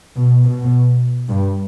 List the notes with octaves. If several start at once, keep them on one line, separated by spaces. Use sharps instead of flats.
B2
B2
G2